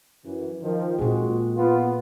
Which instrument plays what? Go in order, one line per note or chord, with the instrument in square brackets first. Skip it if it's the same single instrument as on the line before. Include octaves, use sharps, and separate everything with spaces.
[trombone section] F#2 E3
D#3 F3
[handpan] A#2 G#4 [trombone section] G#3 C4 F#4
[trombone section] B3 F4